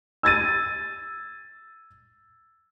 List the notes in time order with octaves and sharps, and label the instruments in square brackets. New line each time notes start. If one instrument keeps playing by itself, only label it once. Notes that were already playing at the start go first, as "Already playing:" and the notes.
[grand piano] E6 G#6 A6 D#7